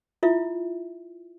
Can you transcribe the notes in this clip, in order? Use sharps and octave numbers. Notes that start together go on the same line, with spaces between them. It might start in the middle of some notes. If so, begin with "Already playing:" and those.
E4 F4 E5